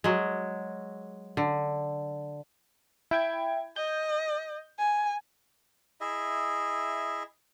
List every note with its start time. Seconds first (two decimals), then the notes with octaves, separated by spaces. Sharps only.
0.04 F#3 G#3
1.37 D3
3.11 E4 G5 G#6
3.76 D#5 G6
4.79 G#5
6.01 E4 G#4 D#5 E5